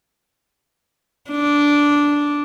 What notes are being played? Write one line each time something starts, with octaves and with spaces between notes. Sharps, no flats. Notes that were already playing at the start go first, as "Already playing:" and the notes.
D4